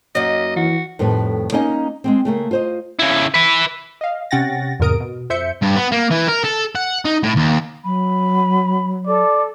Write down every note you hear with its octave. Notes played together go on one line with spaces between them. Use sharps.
F#2 A#3 D#4 D#5
E3 F#4
F2 A2 D#3 G3 B4
A#3 C#4 D#4 D#5 G#5
G#3 A#3 C4
C#3 A3 A#3
F4 C5 D#5
C#3 E4
B4 E5
D#5 F5
C3 C#4 F#5 G5 A6 A#6
E2 G#2 C3 A#4 D#6 D7
B2
F2 C5 E5 G6 C#7
G2
B3
A#3
E3
A#4
A4
F#5
D#4
A2
D#2
F#3 B5
A4 D5